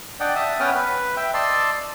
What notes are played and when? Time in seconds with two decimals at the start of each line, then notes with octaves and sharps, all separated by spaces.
0.20 D4 D5 D#5 F#5 G5
0.35 E5 A5 D#6
0.60 B3 C#4 B4 G5 D#6 F6
0.75 B4
1.17 E5 G5
1.34 D5 D#5 A5 C6 E6